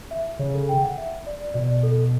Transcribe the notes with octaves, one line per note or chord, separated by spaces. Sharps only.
E5
C#3 C#5
A4
G5
F#5
E5
D5
B2 D5
A4